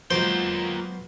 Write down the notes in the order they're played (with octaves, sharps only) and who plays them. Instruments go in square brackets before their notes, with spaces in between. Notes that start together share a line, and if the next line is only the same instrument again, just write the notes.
[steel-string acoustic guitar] F#3 G#3 B3 [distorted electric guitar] A#3 G5 [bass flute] F4 [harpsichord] C5